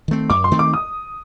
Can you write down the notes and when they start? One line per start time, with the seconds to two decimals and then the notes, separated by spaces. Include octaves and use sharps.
0.08 D#3 A3 C4
0.30 F#2 D6
0.44 C6
0.51 D#3 A3 C4
0.59 D6
0.74 D#6